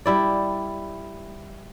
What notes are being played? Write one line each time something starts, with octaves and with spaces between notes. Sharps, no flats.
G3 E4 D5